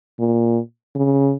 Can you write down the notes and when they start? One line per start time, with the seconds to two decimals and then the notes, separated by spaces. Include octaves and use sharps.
0.19 A#2
0.95 C#3